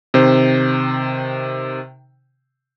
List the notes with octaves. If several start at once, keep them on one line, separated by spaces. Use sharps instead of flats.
C3 D#3 C5